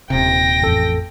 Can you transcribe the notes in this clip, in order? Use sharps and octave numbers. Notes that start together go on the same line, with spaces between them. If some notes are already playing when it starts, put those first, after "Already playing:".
D#1 C3 G5 A#6
A1 F2 A4